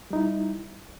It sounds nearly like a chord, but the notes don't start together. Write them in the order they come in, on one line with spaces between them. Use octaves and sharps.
G3 D#4 E4